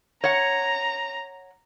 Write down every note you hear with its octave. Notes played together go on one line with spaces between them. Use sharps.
C#5 F#5 A#5